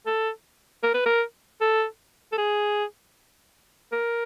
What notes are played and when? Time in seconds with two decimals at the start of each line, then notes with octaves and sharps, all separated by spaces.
0.06 A4
0.83 A#4
0.94 B4
1.06 A#4
1.61 A4
2.32 A4
2.38 G#4
3.92 A#4